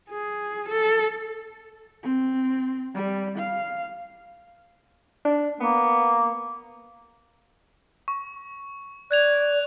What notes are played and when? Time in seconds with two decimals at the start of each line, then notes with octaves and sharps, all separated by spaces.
0.10 G#4
0.68 A4
2.03 C4
2.94 G3
3.38 F5
5.25 D4
5.60 A#3 B3
8.08 C#6
9.11 D5 F#6 G#6 F7